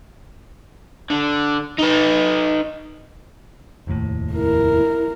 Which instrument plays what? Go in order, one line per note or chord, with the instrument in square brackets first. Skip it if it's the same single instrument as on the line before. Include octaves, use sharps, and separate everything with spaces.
[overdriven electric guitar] D3
D#4 B4
[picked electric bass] F1 D#2 A2
[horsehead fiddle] E4 A#4